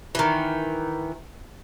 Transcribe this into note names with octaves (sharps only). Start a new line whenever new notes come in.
D#3 E3